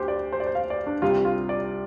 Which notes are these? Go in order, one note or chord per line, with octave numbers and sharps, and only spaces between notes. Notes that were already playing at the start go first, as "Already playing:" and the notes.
Already playing: D2 G4 C5
D5
C5
D5
C5
F5
D5
D4
C2 C3 G3 F4
F4
D5